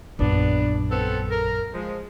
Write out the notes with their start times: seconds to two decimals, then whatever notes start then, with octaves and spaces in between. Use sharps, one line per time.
0.19 A#1 F#2 B3 D4
0.90 B3 C4 A4
1.30 A#4
1.74 F3 G#3